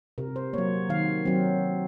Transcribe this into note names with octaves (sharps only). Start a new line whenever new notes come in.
C3 A#4
C5
F#3 A#3 C#5
D#3 F5
F#3 C4